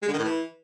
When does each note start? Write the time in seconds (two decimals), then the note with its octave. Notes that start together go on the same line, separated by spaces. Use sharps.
0.02 G#3
0.08 D3
0.13 D#3
0.19 A2
0.24 E3